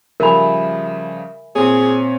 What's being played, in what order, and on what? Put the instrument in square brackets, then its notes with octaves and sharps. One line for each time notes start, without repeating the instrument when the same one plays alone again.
[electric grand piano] C#3 F3 G3 [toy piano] A#4 B5 [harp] E5 G#5
[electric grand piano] A#2 C#5 [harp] C4 [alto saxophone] G#4